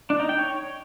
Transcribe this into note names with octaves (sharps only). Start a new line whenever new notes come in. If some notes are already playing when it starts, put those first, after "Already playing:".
D4
D#4
G5
C#5